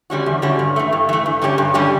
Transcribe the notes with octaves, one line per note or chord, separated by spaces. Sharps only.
D3 G3 C#4 F#4
E2
D3 G3 C#4 F#4
G2
E3 A3
G2
E3 A3
G2
D3 G3 C#4 G4
G2
D3 G3 C#4 G4